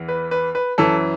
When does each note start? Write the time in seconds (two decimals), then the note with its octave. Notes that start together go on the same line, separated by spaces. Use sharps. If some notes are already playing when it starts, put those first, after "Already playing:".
Already playing: E2 E3
0.08 B4
0.31 B4
0.55 B4
0.78 F#2 E3 A4